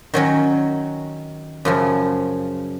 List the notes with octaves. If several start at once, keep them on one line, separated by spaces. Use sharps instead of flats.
D#3 F#3 C#4 F#4
F#2 C#3 F3